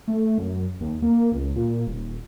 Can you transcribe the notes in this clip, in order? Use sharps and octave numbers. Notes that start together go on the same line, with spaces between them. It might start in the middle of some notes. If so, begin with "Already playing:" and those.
A3
F#2
D#2
A#3
C#2
A#2
D#1